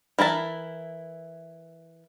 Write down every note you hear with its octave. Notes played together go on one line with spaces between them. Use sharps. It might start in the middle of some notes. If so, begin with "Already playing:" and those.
E3 E4 A#4 A5